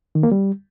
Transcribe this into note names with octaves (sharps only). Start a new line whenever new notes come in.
D#3
A#3
G3